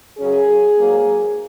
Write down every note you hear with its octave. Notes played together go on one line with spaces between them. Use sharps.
F#2 C#3 F#3 C#4 G#4
G#2 F#3 A#3